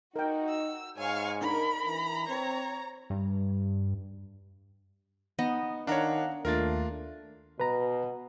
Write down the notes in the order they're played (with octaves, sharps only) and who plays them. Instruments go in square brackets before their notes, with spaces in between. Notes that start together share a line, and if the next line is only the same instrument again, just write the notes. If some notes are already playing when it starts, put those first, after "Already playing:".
[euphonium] D#4 [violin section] F#4 [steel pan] A#4 G5
[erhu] E6
[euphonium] G#2 [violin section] C#5 G#5 C#6 [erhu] F5
[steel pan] D4 D#4 [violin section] A#4 [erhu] B5
[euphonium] E3 [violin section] A#5
[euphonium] C4 [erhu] C#5
[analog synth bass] G2
[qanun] B3 D#5 [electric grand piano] D#4
[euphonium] D#3 [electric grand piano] D4 C#5 [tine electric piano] F5 F#5 A#5
[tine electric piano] D#2 A#3 A6 [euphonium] A3 [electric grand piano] D4 F4 A#4
[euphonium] B2 [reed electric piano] B4 A#5